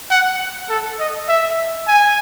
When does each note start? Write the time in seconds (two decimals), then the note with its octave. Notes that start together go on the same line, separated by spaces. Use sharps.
0.11 F#5
0.69 A4
1.00 D#5
1.29 E5
1.88 G#5